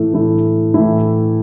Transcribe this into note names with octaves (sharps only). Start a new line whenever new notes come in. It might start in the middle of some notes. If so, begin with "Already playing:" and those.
Already playing: A2 E3 A3 E4
A2 E3 A3 E4
A2 E3 A3 E4